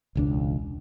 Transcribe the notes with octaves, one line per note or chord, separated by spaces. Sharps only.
E1 C#2 D4